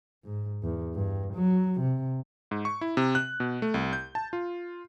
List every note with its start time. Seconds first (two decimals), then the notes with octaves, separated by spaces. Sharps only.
0.25 G#2
0.63 E2
0.95 G2
1.34 F#3
1.81 C3
2.51 G#2
2.65 C#6
2.81 E4
2.97 C3
3.15 F#6
3.40 B2
3.62 A3
3.74 C2
3.93 G6
4.15 A5
4.33 F4